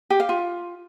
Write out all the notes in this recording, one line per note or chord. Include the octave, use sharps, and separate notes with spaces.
G4
F5
F4